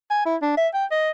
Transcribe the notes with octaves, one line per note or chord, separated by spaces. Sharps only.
G#5
E4
D4
E5
G5
D#5